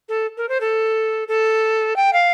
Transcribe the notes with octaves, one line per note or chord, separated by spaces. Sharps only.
A4
A#4
C5
A4
A4
G5
F5